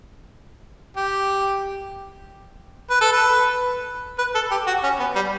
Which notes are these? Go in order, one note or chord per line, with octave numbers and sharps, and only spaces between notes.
G4
B4
A4
B4
B4
A4
G4
F#4
C#4
B3
G3